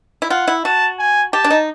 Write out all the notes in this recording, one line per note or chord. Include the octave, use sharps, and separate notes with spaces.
E4
F4 F#5
E4
F#4 A5
G#5
G4 A5
D4
D#4